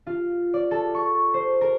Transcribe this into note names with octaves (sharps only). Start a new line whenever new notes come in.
F4
D5
A4
C#6
C5
A#4